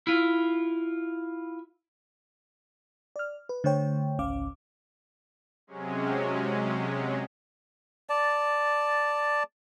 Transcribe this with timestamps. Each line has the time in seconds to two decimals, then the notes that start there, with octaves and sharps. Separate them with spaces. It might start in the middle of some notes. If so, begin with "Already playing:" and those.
0.07 E4 F4
3.16 D5 F6
3.49 B4
3.64 D3 A3 C5 C#5 G5
4.19 G#1 C#2 C#4 F5 D6
5.67 C3 F#3 G#3 C#4
8.10 D5 A5